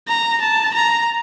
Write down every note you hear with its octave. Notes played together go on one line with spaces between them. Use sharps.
A#5
A5
A#5